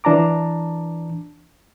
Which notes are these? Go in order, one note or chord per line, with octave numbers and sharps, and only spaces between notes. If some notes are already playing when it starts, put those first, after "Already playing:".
E3 D4 A5 A#5 D6